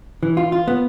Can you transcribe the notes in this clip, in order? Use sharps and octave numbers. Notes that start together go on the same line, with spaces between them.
E3
F4
F4
B3